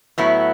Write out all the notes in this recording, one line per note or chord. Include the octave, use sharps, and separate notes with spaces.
A2 F#3 B3 E4